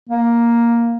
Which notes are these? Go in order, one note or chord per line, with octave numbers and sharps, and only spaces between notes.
A#3